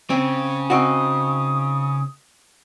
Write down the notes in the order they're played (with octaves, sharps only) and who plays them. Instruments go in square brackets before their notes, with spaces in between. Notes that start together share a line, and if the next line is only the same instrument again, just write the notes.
[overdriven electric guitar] C#3 [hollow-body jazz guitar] C4
[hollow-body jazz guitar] C4 D#4 F#4 [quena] D#6